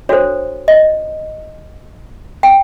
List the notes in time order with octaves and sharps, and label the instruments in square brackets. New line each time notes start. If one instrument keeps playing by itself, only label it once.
[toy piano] D4 F#4 A4 C5 C#5
D#5
G5